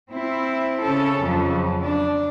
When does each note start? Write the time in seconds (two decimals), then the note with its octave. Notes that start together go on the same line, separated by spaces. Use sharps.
0.12 C4 E4
0.81 C#3 C#4 A4
1.25 F2 C#3 F#3
1.83 D4